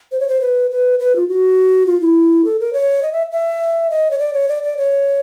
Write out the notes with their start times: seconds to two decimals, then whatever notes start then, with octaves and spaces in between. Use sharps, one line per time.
0.12 C5
0.20 C#5
0.28 C5
0.41 B4
0.71 B4
0.99 B4
1.16 F4
1.28 F#4
1.86 F4
2.00 E4
2.45 A4
2.60 A#4
2.73 C#5
3.03 D#5
3.12 E5
3.32 E5
3.90 D#5
4.11 C#5
4.19 D5
4.33 C#5
4.49 D5
4.63 D5
4.78 C#5